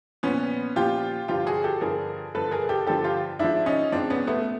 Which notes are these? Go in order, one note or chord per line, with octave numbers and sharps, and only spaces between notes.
A#2 F3 B3 C#4
A#2 F3 F4 G4
G2 D3 F3 F4 G4
F#4 G#4
G4 A4
G2 D3 F3 G#4 A#4
G2 D3 F3 A4 B4
G#4 A#4
G4 A4
G2 D3 F3 G4 A4
F4 G4
G#2 F3 D4 E4
C#4 D#4
G#2 F3 C4 D4
B3 C#4
A3 B3